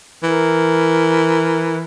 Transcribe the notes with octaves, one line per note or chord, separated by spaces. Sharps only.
E3 A#4